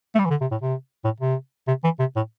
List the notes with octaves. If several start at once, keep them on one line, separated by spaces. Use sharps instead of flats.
A3
G3
E3
D3
C3
A2
C3
A2
C3
C3
E3
C3
A2